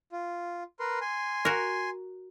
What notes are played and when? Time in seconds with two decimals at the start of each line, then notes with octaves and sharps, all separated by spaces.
0.12 F4
0.79 A#4 B4 C6
1.01 G#5 C6
1.45 F#4 A#4